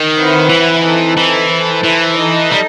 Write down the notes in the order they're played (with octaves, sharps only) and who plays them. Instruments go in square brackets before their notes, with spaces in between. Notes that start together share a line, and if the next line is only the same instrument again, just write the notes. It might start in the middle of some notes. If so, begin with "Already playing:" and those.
Already playing: [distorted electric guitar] D#3
[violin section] C4 E4 B4 F#5
[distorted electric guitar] E3
[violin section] C4 D#4 A4
[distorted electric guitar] E3
[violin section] E4 A4 C5
[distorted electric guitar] E3
[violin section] D#4 A4 D#5
[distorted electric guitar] G3